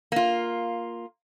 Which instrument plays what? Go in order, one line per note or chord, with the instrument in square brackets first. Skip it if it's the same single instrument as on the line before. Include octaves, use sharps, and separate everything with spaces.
[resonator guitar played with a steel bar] A#3 F4